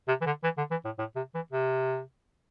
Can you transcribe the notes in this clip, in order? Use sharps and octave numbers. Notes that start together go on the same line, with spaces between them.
C3
E3
D3
E3
D3
E3
A2
A2
C3
E3
C3